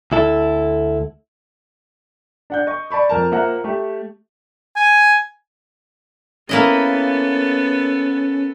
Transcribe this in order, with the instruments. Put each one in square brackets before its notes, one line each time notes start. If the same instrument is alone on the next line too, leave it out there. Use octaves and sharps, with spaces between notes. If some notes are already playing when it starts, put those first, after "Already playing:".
[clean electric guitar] D2 E4 A4
[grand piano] D4 F#5 G6
D#5 C#6
D5 A5 B5 C#6
F2 A#4 A5
A#3 F4 C5 E5 F#5 A#5
A3 G4
[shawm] G#5
[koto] A#3 E4 D#5 [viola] B3 A4 [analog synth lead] C#4